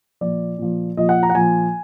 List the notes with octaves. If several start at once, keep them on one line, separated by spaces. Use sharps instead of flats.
A#2 F3 D5
A#2 F3
A#2 F3 D#5
F#5
A#5
F#5
A#2 F3 G#5